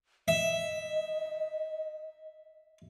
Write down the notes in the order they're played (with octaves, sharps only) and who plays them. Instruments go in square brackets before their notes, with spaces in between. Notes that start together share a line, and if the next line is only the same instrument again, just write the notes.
[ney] D#5 [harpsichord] E5